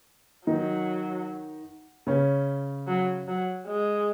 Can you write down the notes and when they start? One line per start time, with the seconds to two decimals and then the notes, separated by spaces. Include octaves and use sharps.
0.47 D#3 F#3 D#4
2.07 C#3 C#4
2.87 F#3
3.28 F#3
3.67 G#3